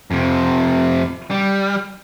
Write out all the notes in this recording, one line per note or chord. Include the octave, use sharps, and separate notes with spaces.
F2 C3
G3